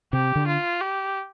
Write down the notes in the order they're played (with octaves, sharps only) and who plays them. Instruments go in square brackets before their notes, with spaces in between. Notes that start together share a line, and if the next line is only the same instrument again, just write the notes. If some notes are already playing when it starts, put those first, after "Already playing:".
[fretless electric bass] C3 [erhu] G4
[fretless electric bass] D3
[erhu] F4
G4